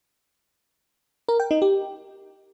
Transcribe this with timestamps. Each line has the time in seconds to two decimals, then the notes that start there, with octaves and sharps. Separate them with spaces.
1.28 A#4
1.40 G5
1.51 D#4
1.62 G4